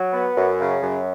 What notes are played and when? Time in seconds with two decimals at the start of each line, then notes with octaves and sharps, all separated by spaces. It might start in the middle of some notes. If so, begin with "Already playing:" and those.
Already playing: F#3
0.13 B3
0.36 F#2
0.60 C#3
0.82 F#2